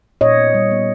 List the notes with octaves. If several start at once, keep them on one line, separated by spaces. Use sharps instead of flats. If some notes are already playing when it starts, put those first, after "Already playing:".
A#2 C#5 D#5
B3
G3
B3